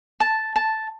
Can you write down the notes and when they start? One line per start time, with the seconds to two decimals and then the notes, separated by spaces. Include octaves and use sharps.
0.20 A5
0.56 A5